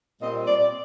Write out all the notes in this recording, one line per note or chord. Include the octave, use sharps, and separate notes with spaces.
A#2 G3 C4 D#5
D5